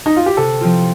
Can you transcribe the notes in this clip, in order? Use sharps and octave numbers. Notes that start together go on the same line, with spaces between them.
D#4
F4
G4
C3 A4
F3 C4 F4